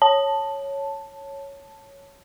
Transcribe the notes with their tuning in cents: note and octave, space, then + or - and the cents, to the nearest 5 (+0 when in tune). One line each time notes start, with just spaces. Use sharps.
C#5 +0 A5 +0